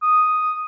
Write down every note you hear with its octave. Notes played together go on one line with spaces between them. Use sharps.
D#6